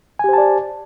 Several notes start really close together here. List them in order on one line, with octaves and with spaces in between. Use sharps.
G#5 G4 C5 A5 D5